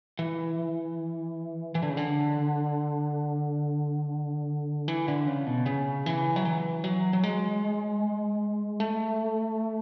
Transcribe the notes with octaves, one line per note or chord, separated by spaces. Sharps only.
E3
E3
D3
C#3
D3
E3
D3
C#3
B2
C#3
E3
F#3
E3
F#3
F#3
G#3
A3